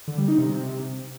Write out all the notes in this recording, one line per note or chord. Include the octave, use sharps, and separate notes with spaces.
D3
G3
D#4
C3